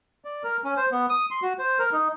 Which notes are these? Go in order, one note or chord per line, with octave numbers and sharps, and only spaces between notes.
D5
A#4
C#4
C5
B3
D#6
C6
F#4
C5
A#4
D#4